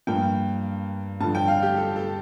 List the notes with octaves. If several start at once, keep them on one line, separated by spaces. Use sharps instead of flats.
G2 F3 A#3 G5
G2 D3 F3 A5
G5
F5
G4
A4
A4